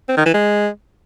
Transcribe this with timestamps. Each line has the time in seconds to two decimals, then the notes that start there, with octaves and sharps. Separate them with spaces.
0.09 C4
0.17 D#3
0.25 E3
0.34 G#3